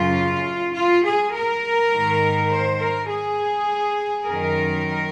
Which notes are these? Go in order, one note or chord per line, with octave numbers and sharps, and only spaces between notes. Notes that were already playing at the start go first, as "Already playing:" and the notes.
Already playing: F#2 C#3 F4
F4
G#4
A#4
G#2 D#3
C5
A#4
G#4
F#2 D#3 A#4